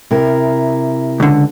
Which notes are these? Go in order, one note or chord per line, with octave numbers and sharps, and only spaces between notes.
C3 E4 A#4
C#2 D3